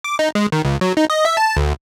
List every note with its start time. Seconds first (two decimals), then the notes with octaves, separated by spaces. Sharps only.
0.04 D6
0.19 D#4
0.35 G#3
0.52 D#3
0.65 C#2
0.81 F#3
0.97 D#4
1.10 D#5
1.25 E5
1.37 A5
1.57 D2